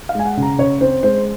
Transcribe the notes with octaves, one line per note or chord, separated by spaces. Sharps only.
F5
G#3 G#5
F#5
C#3
A#5
C#3 C#5
C4 C5
G#3 C5